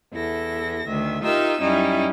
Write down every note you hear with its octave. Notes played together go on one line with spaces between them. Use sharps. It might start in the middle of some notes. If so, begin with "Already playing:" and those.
E2 E4 A4 A#6
D2 D#3 E5
D#4 F4 G4 A#4 E5 E6
F#2 G3 C#4 D#4 E4